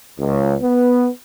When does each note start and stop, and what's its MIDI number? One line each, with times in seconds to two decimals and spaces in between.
0.19 0.55 37
0.62 1.09 59